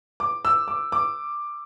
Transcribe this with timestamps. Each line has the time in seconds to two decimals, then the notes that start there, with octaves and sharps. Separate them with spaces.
0.20 D6
0.45 E6
0.68 D6
0.92 D6